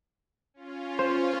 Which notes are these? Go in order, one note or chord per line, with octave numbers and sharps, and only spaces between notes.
C#4 F4
C5